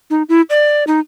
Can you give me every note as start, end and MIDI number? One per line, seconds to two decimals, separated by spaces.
0.10 0.23 63
0.29 0.42 64
0.50 0.84 74
0.87 1.00 63